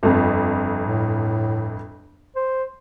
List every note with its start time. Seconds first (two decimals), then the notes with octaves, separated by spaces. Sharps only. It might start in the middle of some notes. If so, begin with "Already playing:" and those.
0.03 G1 F2
0.85 A2
2.36 C5